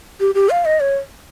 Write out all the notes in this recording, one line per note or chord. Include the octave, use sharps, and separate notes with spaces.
G4
G4
F5
D#5
C#5